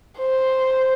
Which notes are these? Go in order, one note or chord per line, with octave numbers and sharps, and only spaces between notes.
C5